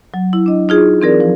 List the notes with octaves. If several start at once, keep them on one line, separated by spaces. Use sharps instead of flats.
F#3
E4
D4 D#5
D#4 F4 G#4
E3 C4 G#4 A#4 D5
F3